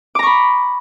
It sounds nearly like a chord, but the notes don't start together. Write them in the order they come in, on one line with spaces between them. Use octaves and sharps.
D6 A#5 C#6 B5